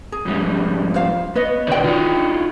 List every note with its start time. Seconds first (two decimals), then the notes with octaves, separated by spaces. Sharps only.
0.12 G#4
0.25 F2 G#2 G3
0.94 F4 C5 F5
1.35 B3 B4 C#5 D#5
1.67 B2 D#3 B4 D5 G5
1.84 D#4 F4 F#4